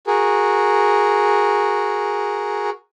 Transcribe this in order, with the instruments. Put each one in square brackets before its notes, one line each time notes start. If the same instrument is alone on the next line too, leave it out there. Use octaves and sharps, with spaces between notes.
[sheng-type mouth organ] F#4 G#4 A#4